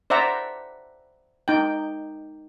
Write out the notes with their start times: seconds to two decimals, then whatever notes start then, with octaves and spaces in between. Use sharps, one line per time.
0.10 C5 D5 E5 F#5 A#5
1.48 D#4 G5